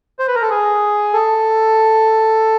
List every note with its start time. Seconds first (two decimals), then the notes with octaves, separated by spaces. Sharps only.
0.19 C5
0.28 B4
0.35 A#4
0.42 A4
0.50 G#4
1.13 A4